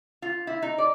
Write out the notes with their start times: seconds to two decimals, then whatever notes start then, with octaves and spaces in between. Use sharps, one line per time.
0.22 F4
0.47 E4
0.62 D#4
0.78 D5